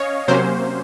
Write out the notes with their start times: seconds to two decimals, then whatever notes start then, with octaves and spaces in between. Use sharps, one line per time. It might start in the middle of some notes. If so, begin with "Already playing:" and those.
Already playing: C#4 C#5 D#5 F5
0.28 C3 F#3 A#3 C#4 C5